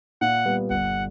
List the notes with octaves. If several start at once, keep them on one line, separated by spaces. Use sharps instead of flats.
A#2 F#5
G3 B3
G1 F#5